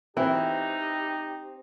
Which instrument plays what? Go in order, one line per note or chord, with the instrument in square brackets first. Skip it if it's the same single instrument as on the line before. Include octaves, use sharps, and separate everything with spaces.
[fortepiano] E3 [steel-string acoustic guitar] C4 [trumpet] D#4 [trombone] G4